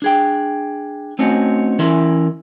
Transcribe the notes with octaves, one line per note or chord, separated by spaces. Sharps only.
D4 G#4 G5
A3 C4 C#4 D#4 F#4
E3 C#4 E4 A#4 E5 C6